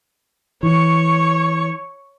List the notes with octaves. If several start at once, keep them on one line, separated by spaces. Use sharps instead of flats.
E3 C#5 C#6